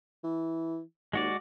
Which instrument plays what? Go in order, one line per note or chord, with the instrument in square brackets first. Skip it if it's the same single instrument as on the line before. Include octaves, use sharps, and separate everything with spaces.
[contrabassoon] E3
[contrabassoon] D#2 [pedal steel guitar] G#3 F#4 D5